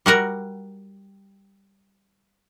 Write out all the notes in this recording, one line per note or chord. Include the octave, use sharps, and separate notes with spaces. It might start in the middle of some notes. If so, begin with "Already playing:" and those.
G3 F#4 A#4 F#5